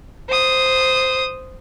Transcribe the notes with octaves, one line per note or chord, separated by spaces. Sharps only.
C5 D#6